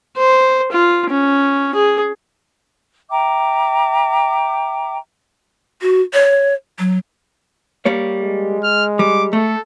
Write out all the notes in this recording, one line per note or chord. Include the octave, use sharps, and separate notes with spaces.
C5
F4
C#4
G#4
E5 G5 A#5 D6
F#4
C#5
F#3
G3 A#3 C#5
G#3
F6
G3 D6
A3 A4